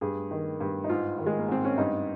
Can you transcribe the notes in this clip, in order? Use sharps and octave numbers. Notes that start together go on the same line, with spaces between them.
G2 G#4
D#3
G2
D#4
G#2 F4
D#3
G#3
A#3
G#2 C4
C#4
G2 D#4